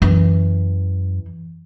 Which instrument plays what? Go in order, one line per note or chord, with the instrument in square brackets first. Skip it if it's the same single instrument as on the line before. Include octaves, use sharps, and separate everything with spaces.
[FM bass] F#2 [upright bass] E3